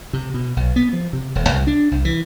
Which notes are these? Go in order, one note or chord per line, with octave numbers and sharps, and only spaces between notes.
C3
B2
B1
B3
F3
C3
D#1
C2
D4
C2
E3